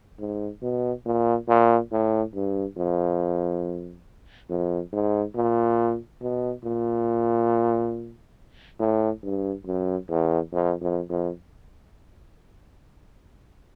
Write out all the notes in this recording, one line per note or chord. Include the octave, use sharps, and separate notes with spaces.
G#2
B2
A#2
A#2
A2
G2
F2
F2
G#2
A#2
B2
A#2
A2
G2
F#2
E2
F2
F2
F2